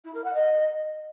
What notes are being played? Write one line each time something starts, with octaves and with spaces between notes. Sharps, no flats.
E4
A#4
F#5
D#5